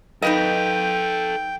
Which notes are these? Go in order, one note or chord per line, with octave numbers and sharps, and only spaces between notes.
D#4 A4 B4 D#5 F5 G5